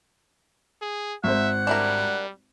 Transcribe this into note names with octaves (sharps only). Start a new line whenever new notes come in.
G#4
G#1 C5 E5 F#5
G3 D4 E4 A#4